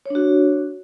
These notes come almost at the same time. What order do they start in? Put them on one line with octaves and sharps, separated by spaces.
C#5 D4 F#4